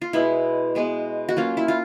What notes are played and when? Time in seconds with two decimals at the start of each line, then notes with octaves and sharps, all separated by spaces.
0.02 F4
0.13 B2 G#3 B3 E4
0.75 B2 G#3 B3
1.29 F#4
1.37 F#3 A#3 C#4 F4
1.57 E4
1.68 F4